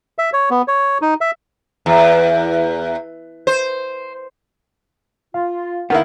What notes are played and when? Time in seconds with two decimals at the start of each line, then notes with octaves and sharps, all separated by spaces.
0.18 E5
0.33 C#5
0.50 B3
0.68 C#5
1.02 D#4
1.21 E5
1.86 E2
3.47 C5
5.34 F4 F5
5.90 D#3 B3 E4 A#4 F5 F#5